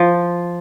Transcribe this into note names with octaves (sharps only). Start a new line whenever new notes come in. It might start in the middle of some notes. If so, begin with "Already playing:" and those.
Already playing: F3